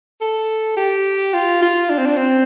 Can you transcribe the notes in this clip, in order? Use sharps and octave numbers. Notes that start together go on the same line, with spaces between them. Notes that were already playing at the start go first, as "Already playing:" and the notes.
A4
G4
F4
F4
D4
C4
D4
C4